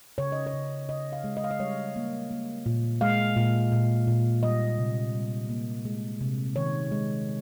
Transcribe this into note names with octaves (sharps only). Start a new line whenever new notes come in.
C#3 C#5
D#5
C#5
C#3
C#3 D#5
F5
G#3
D#5
F5
D#5
G3 C#5
A#3
A#3
A#2
G#3 F5
A#2
A#2
A#2
G3 D#5
C3
G3
A#3
G#3
C3
D#3 C#5
G#3